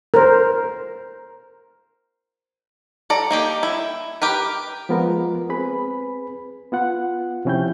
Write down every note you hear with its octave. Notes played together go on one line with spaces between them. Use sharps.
A#4 C5
A4 D5 A#5
A#3 D#4 G4
E4
G4 A#4 B4
F3 G#3 B3 F4 A#4
C4 G#4 B4 B5
B3 F4 F#5
C3 F3 C#4 E4 G5 G6